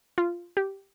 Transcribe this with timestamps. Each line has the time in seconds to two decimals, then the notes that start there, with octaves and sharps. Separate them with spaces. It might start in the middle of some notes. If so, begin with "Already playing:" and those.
0.18 F4
0.57 G4